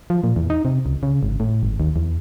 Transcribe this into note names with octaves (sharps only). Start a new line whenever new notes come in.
F3
A#2
E2
D#4
C3
C#2
C#3
G#1
A2
G#1
D#2
E2